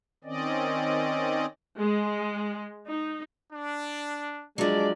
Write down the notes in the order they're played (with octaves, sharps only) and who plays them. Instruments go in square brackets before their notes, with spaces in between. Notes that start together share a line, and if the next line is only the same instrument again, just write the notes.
[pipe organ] D#3 C4 C#4 D5 D#5
[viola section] G#3
D#4
[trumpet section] D4
[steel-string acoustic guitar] F3 F#3 [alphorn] G#3 [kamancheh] D4 D5